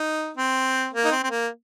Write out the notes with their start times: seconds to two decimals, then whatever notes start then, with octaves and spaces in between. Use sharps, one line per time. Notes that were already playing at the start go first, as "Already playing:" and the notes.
Already playing: D#4
0.37 C4
0.93 A#3
1.05 D#4
1.12 C4
1.23 C4
1.31 A#3